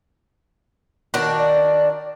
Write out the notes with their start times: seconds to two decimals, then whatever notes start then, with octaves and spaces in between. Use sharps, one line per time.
1.14 D#3 D4 F#4
1.38 D5